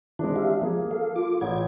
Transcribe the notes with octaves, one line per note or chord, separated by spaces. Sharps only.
D#3 E3 G#3 C4 D4 E4
G4 E5 F5
F3 A#3 G#4
A4 F5
F4 D6
A1 G#6